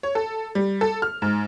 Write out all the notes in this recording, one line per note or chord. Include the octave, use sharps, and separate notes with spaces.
C#5
A4
G3
A4
F6
G#2